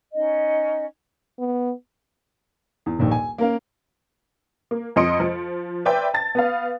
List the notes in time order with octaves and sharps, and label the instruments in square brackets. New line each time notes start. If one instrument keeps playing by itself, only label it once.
[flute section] C#4 D#4 D#5
[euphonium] B3
[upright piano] E2
D#1 A#1 D#2
G#5
A#3 C#4 A#4 F5
[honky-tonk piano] A#3
F2 F3 D#5 C6 C#7 D7
F3
B4 C5 D5 E5 G5
A5 A6
B3 B4 F5